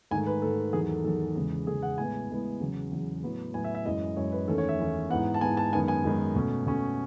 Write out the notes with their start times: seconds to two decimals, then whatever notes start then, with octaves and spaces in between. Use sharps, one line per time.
0.11 G#2 D#3 A3 G#5
0.26 B4
0.42 G#2 D#3 A3 A4
0.73 E2 D#3 F#3 G#4
0.89 A4
1.04 E2 D#3 F#3 A4
1.36 E2 C#3 G#3
1.67 E2 C#3 G#3 G#4
1.83 F#5
1.98 A2 E3 G#3 B3 G#5
2.29 A2 E3 G#3 B3
2.60 E2 C#3 F#3
2.92 E2 C#3 F#3
3.23 A2 F#3 B3
3.54 A2 F#3 B3 G#5
3.64 E5
3.75 E5
3.85 F#2 E3 G#3 D#5
4.16 F#2 E3 G#3 C#5
4.32 B4
4.48 E2 D#3 A3 C#4 A4
4.58 C#5
4.69 E5
4.79 E2 D#3 A3 C#4
5.10 G#2 E3 B3 F#5
5.34 A5
5.41 G#2 E3 B3 G#5
5.57 A5
5.73 F#2 D#3 G#3 B3 G#5
5.88 G#5
6.04 F#2 D#3 G#3 B3
6.35 B2 A3 C#4
6.67 B2 A3 C#4